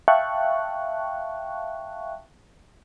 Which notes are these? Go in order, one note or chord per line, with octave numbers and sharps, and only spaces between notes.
E5 F5 G5 A5 C#6 F#6